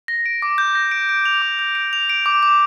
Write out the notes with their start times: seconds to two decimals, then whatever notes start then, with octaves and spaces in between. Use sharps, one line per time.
0.08 A#6
0.26 D7
0.42 D6
0.58 G6
0.75 A#6
0.91 D7
1.09 D7
1.25 F7
1.42 D6
1.59 G6
1.75 D7
1.93 F7
2.10 D7
2.26 D6
2.43 D6